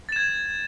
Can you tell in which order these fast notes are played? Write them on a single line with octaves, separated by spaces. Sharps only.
A6 E7 G#6